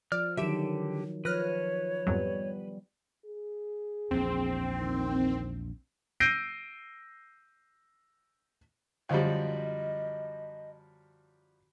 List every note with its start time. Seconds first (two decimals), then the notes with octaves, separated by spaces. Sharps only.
0.12 F3 D5 F6
0.37 D3 D#3 F#3 G4 E5 D7 E7
1.25 F3 B4 C#5 F6 F#6 A#6
2.07 F2 G#2 F#3 G3 B3
3.26 G#4
4.11 A#1 E2 C4
4.77 D#3
6.20 E6 G6 A#6 C7 D7 D#7
9.09 F#2 D3 F3 G3 D#5 F5